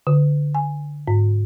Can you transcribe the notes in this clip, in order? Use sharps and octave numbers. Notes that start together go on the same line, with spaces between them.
D3
G#5
G#2